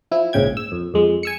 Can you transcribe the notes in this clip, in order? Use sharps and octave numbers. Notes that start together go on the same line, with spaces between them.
F3 E4
A#1 G#2 C#3 G5 G#6
E6
F2
F2 G#3
G#5 E6 C#7